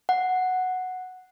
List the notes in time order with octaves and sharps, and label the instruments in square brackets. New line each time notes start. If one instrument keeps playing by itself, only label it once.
[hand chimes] F#5